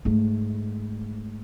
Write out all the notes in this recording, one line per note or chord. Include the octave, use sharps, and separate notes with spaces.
G#2 A3